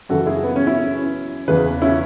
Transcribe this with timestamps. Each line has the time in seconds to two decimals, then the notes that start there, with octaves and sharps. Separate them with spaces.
0.09 F#2 C#3 E3 F#4 A4
0.27 E4 G#4
0.44 B3
0.56 C#4
0.67 C#4 E4
1.48 E2 C#3 E3 G#4 B4
1.82 C#4 E4